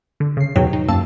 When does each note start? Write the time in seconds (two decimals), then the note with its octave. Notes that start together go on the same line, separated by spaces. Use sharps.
0.20 D3
0.37 C#3 C7
0.56 E2 G#2 B2 F#3 G5
0.73 D#4
0.88 F#2 A#3 A5 E6